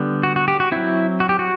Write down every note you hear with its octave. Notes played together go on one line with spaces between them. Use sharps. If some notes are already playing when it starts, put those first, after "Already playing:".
Already playing: D3 G3 B3
F#4
F#4
G4
F#4
F#3 C4 E4
F#4
G4
F#4